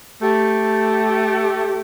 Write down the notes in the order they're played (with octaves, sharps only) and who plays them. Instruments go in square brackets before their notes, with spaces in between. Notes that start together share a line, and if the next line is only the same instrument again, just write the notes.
[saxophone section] A3 G4